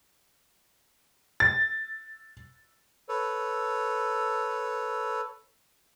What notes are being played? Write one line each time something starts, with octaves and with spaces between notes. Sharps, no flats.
A6
A4 B4 C#5